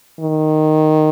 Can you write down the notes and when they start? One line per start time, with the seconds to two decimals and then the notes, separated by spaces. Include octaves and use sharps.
0.21 D#3